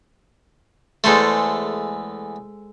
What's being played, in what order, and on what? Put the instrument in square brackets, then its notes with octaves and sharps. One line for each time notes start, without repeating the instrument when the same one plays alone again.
[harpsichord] E2 A3 [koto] G#3 A4 C5